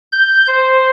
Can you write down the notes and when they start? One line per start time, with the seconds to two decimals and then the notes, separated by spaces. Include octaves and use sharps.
0.12 G6
0.47 C5